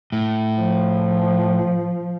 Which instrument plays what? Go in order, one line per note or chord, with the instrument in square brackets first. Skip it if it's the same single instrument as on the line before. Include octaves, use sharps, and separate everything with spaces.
[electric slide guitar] A2
[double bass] F3